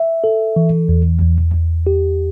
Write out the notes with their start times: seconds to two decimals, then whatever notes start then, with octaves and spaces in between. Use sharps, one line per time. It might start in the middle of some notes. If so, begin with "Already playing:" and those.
Already playing: E5
0.24 A4
0.56 E3
0.89 E2
1.22 E2
1.54 E2
1.87 G4